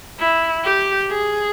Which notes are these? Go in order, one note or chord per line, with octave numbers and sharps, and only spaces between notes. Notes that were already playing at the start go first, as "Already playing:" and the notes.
E4
G4
G#4